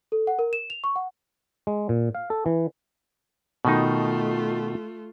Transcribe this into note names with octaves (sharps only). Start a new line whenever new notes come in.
A4
F#5
A#4
E7
F7
C#6
F#5
G#3
A#2
F5
A4
E3
B2 D#3 A3 D#4 F4